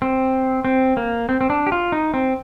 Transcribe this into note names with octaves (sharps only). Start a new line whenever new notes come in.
C4
C4
A#3
C4
C4
D4
G4
F4
D#4
C4